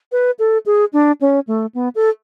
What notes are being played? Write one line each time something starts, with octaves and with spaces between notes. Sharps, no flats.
B4
A4
G#4
D4
C#4
A3
B3
A4